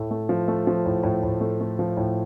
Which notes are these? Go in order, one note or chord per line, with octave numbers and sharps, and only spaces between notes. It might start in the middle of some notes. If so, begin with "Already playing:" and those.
Already playing: A2 A3
A3
F3
A3
F3
A2
A2
A2
A3
A3
F3
A2